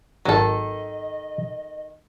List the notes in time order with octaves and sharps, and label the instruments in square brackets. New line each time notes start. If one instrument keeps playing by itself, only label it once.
[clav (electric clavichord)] G#1 F#3 [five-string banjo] D#3 A4 [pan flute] D#5